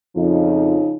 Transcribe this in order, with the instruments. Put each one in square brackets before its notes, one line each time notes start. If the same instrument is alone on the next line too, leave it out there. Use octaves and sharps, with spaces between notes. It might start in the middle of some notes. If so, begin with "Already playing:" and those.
[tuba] F2 [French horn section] C#3 F3 D#4